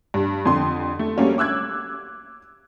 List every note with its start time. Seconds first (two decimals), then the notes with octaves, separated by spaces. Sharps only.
0.14 G2
0.45 F2 D3 C6
0.99 A3
1.17 G3 A3 A#3 C#4 F#4
1.38 D6 E6 F#6 G#6